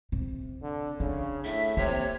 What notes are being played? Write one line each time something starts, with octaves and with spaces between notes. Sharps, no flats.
C3
D3
C#3 D4
A2 E5
C3 A#3 C#5